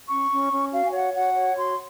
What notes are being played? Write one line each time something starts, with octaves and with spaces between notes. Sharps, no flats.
C#4 C#6
C#4
C#4
F#4 F5
G#5
C#5 F#5
F#4 F#5
C#5
F#4 C6